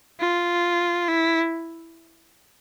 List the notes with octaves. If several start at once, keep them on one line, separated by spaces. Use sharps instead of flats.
F4
E4